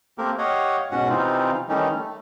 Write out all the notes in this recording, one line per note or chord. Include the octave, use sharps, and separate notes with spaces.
A3 A#3 C4 G4 A#4
G4 C#5 D#5 F5 F#5
G#2 B2 C#4 F#4 F#5
C3 E3 C4 D#4 F4
D#3 E3 G3 A3 C#4 D#4
A3